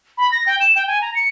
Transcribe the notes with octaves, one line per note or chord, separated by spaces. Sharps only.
B5
A#6
G5
E7
G5
G#5
A#5
C#7